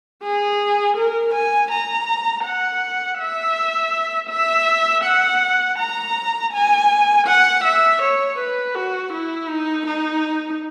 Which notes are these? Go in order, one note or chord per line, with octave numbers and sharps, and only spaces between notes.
G#4
A#4
G#5
A#5
F#5
E5
E5
F#5
A#5
G#5
F#5
E5
C#5
B4
F#4
E4
D#4
D#4